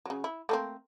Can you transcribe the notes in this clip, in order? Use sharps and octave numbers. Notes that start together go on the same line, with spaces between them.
C#3 F#3
E4
A3 A#3 C4